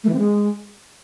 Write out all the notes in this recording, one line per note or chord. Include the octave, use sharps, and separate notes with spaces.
A3
E3
C4
G#3